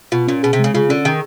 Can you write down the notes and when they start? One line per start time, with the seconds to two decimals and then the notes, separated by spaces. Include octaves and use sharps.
0.12 B2 F4
0.28 A#2 C#4
0.43 B2 G#4
0.53 C3
0.59 C#3 G#3
0.74 C#3 F4
0.89 D3 C#4
1.05 D#3 G#4